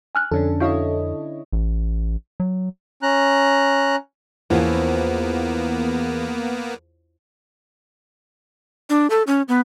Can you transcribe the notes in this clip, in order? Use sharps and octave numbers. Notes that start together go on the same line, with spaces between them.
G#5 F6 F#6
F2 D3 C#4 D4 A4
E4 F#4 C#5 D#5 F5
A1
F#3
C#4 A#5 F#6
E2 F3 A#3 B3 C#4 E4
D4
A4
C#4
B3